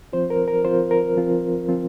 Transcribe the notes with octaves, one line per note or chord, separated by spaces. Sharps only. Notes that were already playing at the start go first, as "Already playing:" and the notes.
F3 C4 F4 C5
A#4
A#4
F3 C4 F4 C5
A#4
F3 C4 F4
F3 C4 F4